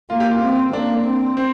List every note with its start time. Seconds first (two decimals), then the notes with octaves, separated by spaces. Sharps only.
0.10 A#3 F4
0.20 G4
0.31 F4
0.41 C4
0.73 A#3 D4
1.05 C4
1.37 C4